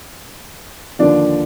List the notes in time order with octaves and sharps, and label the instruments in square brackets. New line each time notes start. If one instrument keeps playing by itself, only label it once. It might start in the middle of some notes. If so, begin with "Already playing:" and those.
[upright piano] D#2 D3 F3 D4 D5